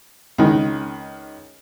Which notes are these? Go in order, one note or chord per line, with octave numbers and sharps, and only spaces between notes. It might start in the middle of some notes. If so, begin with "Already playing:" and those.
C#2 D#3